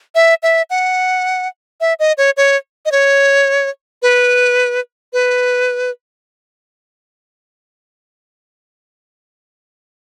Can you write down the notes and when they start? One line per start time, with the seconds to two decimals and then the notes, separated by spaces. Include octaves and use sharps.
0.15 E5
0.43 E5
0.70 F#5
1.81 E5
2.00 D#5
2.18 C#5
2.37 C#5
2.85 D#5
2.92 C#5
4.02 B4
5.13 B4